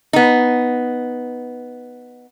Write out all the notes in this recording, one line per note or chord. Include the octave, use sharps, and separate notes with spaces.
B3 D#4